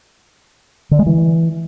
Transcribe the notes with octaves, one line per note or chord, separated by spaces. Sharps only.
D3
G#3
E3